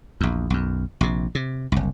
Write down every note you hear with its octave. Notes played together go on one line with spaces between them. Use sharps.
A#1 E2
B1 F#2
A#1 C3
C3
F#1 C2